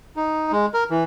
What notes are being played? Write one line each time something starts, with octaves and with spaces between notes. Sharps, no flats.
D#4
G#3
A#4
E3